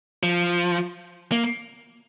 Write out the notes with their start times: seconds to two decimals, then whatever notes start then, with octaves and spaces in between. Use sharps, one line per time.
0.23 F3
1.32 A#3